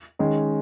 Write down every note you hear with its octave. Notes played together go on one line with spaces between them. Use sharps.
D#3 G#3 C#4